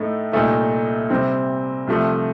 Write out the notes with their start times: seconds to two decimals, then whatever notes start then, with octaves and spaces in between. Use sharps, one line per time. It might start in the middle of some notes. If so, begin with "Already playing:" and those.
Already playing: A2 A3 D#4
0.32 C2 A#2 A3 D#4
1.10 C3 G3 C4
1.87 C2 C3 F3 A3